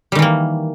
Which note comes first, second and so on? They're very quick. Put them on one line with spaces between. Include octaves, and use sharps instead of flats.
G3 D#3 E3 A#3